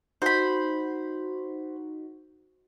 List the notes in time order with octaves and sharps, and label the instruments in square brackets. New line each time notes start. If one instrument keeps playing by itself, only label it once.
[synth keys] D#4 F#4 [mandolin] C5 B5